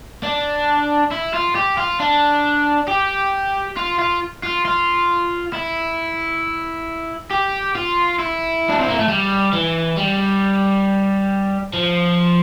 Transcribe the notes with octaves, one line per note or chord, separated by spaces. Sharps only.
D4
E4
F4
G4
F4
D4
G4
F4
F4
F4
F4
E4
G4
F4
E4
D4
C4
A#3
A3
G3
E3
G3
F3